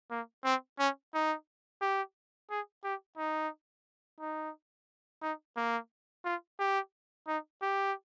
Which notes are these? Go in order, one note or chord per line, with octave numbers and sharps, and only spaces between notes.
A#3
C4
C#4
D#4
G4
G#4
G4
D#4
D#4
D#4
A#3
F4
G4
D#4
G4